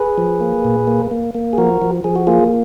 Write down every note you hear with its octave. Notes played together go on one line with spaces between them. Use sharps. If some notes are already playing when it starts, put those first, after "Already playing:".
Already playing: G#4 B4
F3
A#3
A#2
A#3
A#3
A#3
G#4
F3 F#4 A#4
F3
F3 G#4
F#4
A#3 F4 G#4